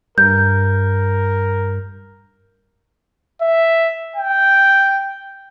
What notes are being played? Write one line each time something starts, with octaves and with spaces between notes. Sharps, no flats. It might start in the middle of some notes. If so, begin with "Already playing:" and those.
G2 A#4 G6
E5
G5